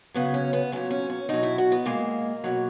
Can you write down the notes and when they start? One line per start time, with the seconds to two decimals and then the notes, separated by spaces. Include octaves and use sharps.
0.14 C#3 F#3 B3
0.34 C#4
0.53 B3
0.72 A#2 F#3 C#4
0.91 C#4
1.10 C#4
1.29 B2 F#3 D#4
1.43 E4
1.58 F#4
1.72 B3
1.86 A#2 G#3 A#3
2.44 B2 F#3